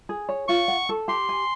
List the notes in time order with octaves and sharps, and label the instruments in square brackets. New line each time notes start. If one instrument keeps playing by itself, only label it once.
[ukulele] G#4
C#5
[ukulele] F4 [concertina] C#6
[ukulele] F#5
A4
[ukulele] G4 [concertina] C6
[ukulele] G#5